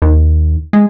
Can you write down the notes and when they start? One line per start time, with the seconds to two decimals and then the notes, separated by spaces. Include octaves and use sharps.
0.02 D#2
0.73 G#3